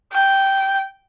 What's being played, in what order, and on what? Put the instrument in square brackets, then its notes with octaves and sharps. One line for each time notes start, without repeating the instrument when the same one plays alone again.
[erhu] G5